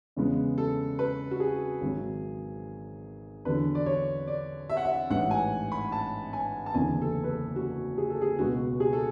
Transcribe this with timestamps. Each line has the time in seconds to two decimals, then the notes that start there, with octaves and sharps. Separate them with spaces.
0.16 E2 C#3 G#3 B3
0.58 A4
0.99 B4
1.31 F#4
1.40 G#4
1.81 G#1 G#2 F#3
3.45 E2 D3 F#3 B4
3.75 D5
3.86 C#5
4.27 D5
4.69 E5
4.77 F#5
4.85 E5
5.10 A1 G#2 E3 F#5
5.31 G#5
5.72 B5
5.92 A5
6.33 G#5
6.66 A5
6.74 F#1 E2 D3 G#5
7.02 A4
7.24 B4
7.29 A4
7.56 F#4
7.98 G#4
8.10 A4
8.21 G#4
8.39 C#2 B2 G#3 B3 F#4
8.80 G#4
8.93 A4